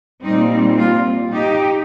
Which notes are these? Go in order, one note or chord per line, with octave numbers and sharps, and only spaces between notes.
A#2 G3 C4 D#4
F4
D#4 G4